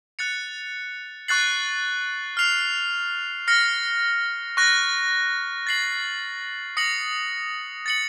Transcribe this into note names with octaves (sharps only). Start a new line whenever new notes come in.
F#6 A6 C#7 F7
C#6 F#6 A6 C7 F#7
F6 C7 F7
F6 A#6 C#7
C#6 F#6 A#6
A6 C7 F#7
D#6 A#6 C#7 F#7
A6 C#7 F#7